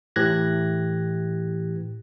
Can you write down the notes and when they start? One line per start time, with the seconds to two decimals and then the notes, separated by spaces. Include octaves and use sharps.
0.16 A2 E3 G4 F#6 G#6 A#6